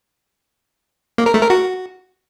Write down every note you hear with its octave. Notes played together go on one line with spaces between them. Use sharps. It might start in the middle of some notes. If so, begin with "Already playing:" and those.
A#3
A#4
A3
A#4
F#4